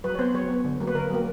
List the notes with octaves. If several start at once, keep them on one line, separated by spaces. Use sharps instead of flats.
F#3 B4
C#5
B3 C5
F#3 C#5
B3
D3
F#3 A#3
B4
D3 A#4
F#3 A#3